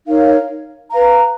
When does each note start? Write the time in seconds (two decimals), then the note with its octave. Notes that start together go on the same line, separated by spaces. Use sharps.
0.06 D#4 A#4 C#5 F5
0.91 B4 F5 A#5